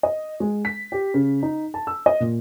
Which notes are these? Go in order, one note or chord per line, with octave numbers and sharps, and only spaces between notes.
D#5
G#3
B6
G4
C#3
D#4
A5
E6
D#5
A#2